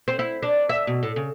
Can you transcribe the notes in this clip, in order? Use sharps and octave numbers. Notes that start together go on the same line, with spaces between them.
C4
E4
D4
E5
B2
A2
C#3